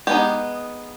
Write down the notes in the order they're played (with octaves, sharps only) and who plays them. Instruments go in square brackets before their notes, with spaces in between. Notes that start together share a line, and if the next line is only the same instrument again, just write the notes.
[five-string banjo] G#3 B3 D#4 G4